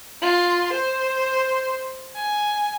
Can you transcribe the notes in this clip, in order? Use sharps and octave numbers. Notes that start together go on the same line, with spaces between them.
F4 C6
C5
G#5